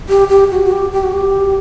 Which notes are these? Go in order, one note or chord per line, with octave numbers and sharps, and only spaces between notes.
G4
G4
F#4
F#4
G4
G4
F#4
G4